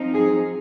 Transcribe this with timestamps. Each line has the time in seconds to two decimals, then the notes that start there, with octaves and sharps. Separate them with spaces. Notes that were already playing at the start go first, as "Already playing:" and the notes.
Already playing: F3 C4 D#4
0.13 G#4